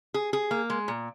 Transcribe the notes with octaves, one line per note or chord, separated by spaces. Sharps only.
G#4
G#4
A#3
G#3
A#2